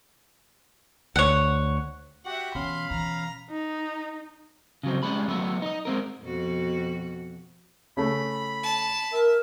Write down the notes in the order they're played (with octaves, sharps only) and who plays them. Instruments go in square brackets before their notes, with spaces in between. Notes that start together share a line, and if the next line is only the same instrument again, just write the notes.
[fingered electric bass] D2 [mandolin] C#5 F#5
[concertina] F#4 G4 [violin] E5 F#5
[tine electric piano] B2 C#4 [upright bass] E3 [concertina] F5 B5 [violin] C6
[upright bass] E3 [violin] A#5
[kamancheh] D#4
[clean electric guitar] C#3 F#3 C4
G3 G#3 C#4 G#4 B5
F#3 A3 B3 E5
D#4 D#5
G#3 C4 A#4
[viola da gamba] F2 B2 F#4
[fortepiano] C#3 A3 [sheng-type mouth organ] B5
[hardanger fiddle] A5
[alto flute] A#4 [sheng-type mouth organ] E5